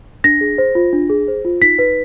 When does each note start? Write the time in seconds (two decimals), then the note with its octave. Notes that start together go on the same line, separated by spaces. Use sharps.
0.24 D4 A#6
0.41 G#4
0.58 C5
0.75 F4
0.93 D4
1.10 G#4
1.28 C5
1.45 F4
1.62 D#4 B6
1.79 B4